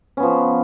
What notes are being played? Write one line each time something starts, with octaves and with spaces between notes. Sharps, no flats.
F3 B3 C#4